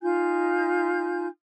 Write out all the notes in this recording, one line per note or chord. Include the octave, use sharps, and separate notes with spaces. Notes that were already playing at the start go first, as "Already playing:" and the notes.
D#4 F4 G#5 G6